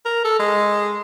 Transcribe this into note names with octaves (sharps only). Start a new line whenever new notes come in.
A#4
A4
G#3